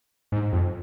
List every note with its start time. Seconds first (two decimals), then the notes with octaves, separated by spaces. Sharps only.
0.32 G#2
0.53 F2